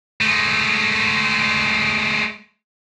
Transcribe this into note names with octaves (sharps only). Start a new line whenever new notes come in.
G#3 A3